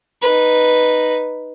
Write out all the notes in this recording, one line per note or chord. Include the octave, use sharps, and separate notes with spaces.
D#4 B4